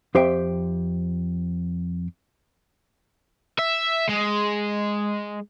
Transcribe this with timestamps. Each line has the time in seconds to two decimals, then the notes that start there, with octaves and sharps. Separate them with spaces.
0.15 F2 G4 C5 E5 G5
3.59 E5
4.09 G#3